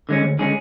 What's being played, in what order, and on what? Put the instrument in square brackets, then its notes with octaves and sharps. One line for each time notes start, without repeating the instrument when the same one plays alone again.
[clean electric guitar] D3 G#3 C#4
D2
D3 G#3 C#4 G#4